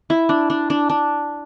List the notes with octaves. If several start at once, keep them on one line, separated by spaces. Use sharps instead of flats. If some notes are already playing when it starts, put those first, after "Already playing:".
E4
D4
D4
D4
D4